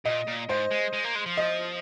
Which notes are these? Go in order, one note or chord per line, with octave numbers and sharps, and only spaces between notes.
A#2 D#5
A#2
G#2 C5
G#3
G#3
A#3
G#3
F3
D#5